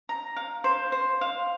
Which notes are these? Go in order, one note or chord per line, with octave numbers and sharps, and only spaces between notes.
A#5
F5
C5
C5
F5